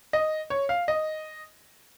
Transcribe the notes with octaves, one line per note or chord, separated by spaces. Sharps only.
D#5
C#5
F5
D#5